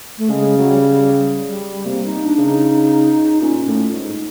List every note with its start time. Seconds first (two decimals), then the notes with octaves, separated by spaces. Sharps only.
0.18 A3
0.29 C#3 G#3
0.57 F#3
0.69 G3
1.47 G3
1.85 C3 A#3
2.06 D#4
2.25 D4
2.38 C#3
2.44 D#4
3.41 A#2 C#4
3.67 A2
3.94 G#2